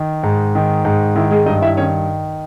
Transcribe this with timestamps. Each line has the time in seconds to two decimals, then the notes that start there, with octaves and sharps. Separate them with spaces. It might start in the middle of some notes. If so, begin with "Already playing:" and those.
Already playing: D#3
0.23 G#2
0.55 D#3
0.85 G#2
1.16 D#3 E4
1.31 G#3 G#4
1.46 G2 D#4 D#5
1.62 E4 E5
1.77 D#3 C#4 C#5